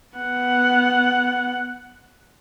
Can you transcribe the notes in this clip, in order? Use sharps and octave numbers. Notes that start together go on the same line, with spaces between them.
B3 F#5